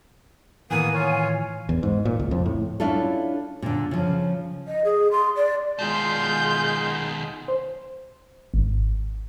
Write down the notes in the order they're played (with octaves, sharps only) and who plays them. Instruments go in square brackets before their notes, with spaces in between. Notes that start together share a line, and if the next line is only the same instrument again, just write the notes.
[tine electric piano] A2 D#3 E3 [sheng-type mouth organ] A#3 B3 D#6 [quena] G#5
[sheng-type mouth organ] F4 C#5
[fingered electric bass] E2
G#2
A#2
C#2
F2
A2
[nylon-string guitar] C#4 D4 E4 F4 A4
A#2 D3
C#3 F3
[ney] D#5
G#4
C6
D5
[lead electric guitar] B2 D#3 [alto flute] G#3 [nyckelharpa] F4 C6 [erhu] G6
[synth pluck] C5
G#1